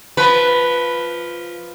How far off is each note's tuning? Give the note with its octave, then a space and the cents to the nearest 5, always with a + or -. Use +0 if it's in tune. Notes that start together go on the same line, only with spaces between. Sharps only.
F3 +0 B4 +0